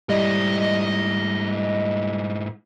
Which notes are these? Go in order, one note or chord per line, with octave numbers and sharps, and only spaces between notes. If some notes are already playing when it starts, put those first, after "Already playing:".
G#2 G3 E4 D#5